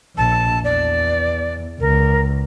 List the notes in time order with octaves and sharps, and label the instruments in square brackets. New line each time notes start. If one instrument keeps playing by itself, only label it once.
[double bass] A#1 [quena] A5
[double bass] E2 [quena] D5
[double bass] C#2 [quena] A#4